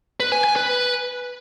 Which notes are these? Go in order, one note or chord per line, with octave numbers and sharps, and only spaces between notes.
B4
G#5
G#5
B4